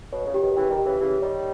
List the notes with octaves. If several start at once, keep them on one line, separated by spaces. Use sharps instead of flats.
B2 C#5
A#2 C#3
G4
B2 D#3
C#3 E3 G5
D#3 G3
G4
C#3 E3
C#3 E3 G4
D#3 G3 C#5